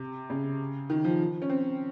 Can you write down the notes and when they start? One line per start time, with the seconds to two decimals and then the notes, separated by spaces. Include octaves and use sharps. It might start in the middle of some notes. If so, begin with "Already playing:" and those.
Already playing: C3
0.30 C#3
0.90 D#3
1.04 F3
1.42 C#4
1.49 C4